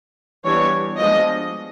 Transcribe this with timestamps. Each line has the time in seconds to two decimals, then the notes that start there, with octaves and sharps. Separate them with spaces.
0.44 E3 G3 B3 D4 C#5
0.99 F3 G#3 B3 D4 D#5